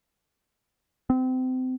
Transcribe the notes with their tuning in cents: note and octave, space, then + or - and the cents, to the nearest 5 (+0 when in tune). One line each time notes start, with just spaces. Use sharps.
C4 -30